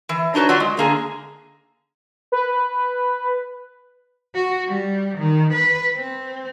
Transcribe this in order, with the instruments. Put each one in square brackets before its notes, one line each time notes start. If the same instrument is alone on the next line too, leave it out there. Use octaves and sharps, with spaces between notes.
[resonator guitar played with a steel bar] E3
D4 D#4 F#4 B4 C#5
F#3 F4 F#4 D5
G#3
D3 A#3 G#4
[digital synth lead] B4
[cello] F#4
G3
D#3
B4
C4